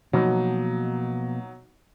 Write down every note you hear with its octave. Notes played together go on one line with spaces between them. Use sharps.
B2 F3 F#3 A#3 D#4